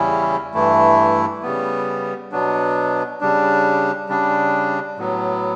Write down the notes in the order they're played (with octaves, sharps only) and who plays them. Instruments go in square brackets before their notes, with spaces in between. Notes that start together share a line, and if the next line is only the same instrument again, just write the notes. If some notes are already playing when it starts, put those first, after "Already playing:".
Already playing: [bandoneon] E2 C#3 G3 C#4 E4
G2 E3 A3 E4
C#3 G3 B3
B2 F#3 B3 D4
C#3 G3 D4
C#3 G3 D4
A2 F#3 B3